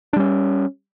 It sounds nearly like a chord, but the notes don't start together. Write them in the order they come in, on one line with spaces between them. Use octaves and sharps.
D4 G3 C#4